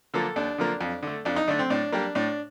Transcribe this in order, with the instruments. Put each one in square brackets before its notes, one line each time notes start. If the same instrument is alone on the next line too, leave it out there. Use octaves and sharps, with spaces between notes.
[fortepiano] D3 F3 A#3 A4
D#2 D4
D3 F3 A#3
F2
D3 A3
F2 D4
D#4
D3 A3 D4
C4
A2 D4
G3 A#3 D4
A2 D4